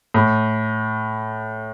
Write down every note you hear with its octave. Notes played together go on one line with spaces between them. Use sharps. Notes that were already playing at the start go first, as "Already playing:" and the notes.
A2